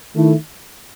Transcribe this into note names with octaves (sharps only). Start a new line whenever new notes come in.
D#3 A3 E4